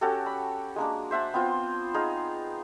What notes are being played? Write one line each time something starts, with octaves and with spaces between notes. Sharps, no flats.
C#4 F#4 G4 A4
B5
G#3 A#3 D4
C5 E5 F#5 A5
B3 C4 F4 C5
D#4 G#4 F5